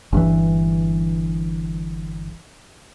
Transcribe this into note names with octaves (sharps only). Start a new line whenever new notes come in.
G1 G2 A#2 E3